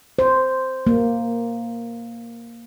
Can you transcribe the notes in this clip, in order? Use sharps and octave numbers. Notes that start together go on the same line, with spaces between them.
C5
A#3